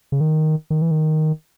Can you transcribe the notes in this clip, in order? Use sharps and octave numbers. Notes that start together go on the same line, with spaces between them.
C#3
D#3
D#3
E3
D#3